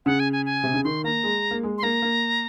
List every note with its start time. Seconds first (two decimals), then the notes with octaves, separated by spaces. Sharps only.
0.06 C#3 F#5
0.19 G#5
0.32 G#5
0.45 G#5
0.63 C3
0.74 C#3
0.84 D#3 C6
1.04 A#3 A#5
1.23 G#3
1.51 A#3
1.63 G#3
1.78 C6
1.83 A#3 A#5
2.02 A#3